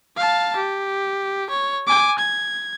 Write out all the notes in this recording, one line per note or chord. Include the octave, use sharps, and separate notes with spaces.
F5 A5
G4
C#5
G#5 D6
G#6